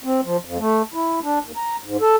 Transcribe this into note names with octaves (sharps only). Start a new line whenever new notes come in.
C4
F3
F2
A3
E4
D4
D#2
A#5
G#2
A4